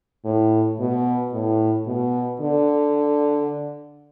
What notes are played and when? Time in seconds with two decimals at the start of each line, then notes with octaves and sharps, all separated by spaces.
0.25 A2
0.80 B2
1.33 A2
1.86 B2
2.41 D3